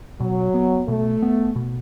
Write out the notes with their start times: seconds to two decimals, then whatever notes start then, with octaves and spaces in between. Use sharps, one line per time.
0.20 B2 F#3
0.54 B3
0.88 B2 A3
1.22 B3
1.56 B2